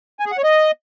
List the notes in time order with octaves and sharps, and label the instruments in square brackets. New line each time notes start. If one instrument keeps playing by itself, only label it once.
[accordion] G#5
G#4
F#5
C#5
D#5